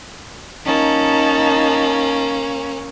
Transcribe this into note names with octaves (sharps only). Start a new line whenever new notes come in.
A#3 C#4 D#4 A5